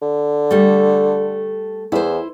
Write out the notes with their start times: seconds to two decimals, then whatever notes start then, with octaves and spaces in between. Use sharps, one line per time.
0.02 D3
0.51 G3 A3
1.92 E2 E4 C5